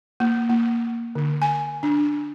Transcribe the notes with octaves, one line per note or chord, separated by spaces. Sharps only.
A#3
A#3
D3
G#5
D4